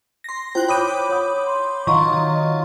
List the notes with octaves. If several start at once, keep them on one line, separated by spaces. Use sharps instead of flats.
C6 A#6
E4 F4 C5 G5 F#6
C#5 B5 D6 D#6 G6 D#7
C#5 F#5 D#6
C6
D#3 F#3 F4 D#5 F#5 C#6